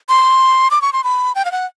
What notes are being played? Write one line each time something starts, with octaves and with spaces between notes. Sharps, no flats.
C6
D6
C#6
C6
B5
G5
F5
F#5